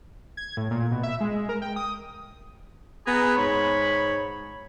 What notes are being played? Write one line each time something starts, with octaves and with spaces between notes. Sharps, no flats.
G#6
A2
A#2
B2
E5
G#3
A#4
G5
D#6
B3 G#4 A#5
G#2 C#5 B5